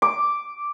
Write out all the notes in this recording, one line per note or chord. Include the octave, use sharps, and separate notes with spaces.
D6